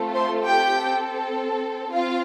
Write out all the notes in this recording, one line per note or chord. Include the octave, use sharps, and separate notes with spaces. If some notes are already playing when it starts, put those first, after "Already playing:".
Already playing: A3 C4 F4 A4
C5 C6
G4 G5
C4 A4
C4 F4 F5